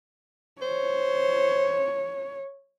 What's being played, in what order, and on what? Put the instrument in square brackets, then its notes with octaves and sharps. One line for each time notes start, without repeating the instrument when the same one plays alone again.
[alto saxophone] C5 [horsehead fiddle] C#5